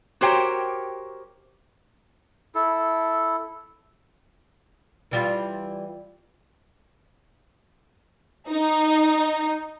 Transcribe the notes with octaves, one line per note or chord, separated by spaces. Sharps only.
F#4 G4 A#4 C5 C#5 G5
E4 A4
E3 G3 F4
D#4